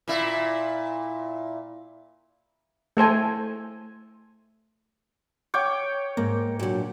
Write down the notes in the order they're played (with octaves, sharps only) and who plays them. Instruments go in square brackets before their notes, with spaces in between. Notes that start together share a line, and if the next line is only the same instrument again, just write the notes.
[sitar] A#2 E4
[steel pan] A3 A4 C5 G#5
[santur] C#5 G5 D6
[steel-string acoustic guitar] G#2 [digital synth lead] A#3 [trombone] A#4
[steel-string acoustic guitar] A#2 D3 [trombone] F#3